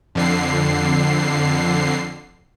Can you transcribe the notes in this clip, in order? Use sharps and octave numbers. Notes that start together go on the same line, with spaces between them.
F2 D3 C7